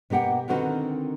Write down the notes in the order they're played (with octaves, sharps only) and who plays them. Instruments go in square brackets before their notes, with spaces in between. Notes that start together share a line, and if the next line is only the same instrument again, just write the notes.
[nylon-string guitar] B2 A#3 G4 F#5 G5
D3 D#3 C4 F#4 A#4 B4